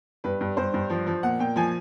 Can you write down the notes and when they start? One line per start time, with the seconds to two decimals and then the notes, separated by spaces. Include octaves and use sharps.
0.24 G2 B4
0.41 G2
0.57 G2 C5
0.74 G2
0.90 F3
1.07 F3
1.23 A#2 F#5
1.39 A#2 G5
1.56 F3 G#5